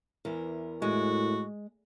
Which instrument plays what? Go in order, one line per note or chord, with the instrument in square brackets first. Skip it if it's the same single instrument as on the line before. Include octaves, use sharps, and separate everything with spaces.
[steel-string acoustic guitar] E2 E3 A#4
[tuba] A2 [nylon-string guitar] G#3 [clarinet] F#4